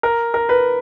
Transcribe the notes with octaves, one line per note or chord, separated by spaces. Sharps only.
A#4
A#4
B4